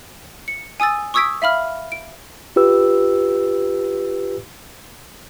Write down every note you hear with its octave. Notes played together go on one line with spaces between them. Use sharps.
C#7
G#5 D#6 E6 A6
C#6 D#6 E6 G#6 B6 D7
E5 F5 B5 F6
D7
F4 G4 B4 E6